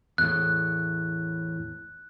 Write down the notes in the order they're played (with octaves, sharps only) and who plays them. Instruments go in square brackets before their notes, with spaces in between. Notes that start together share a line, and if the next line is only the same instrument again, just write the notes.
[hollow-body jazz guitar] E2 A2 [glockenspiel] F#6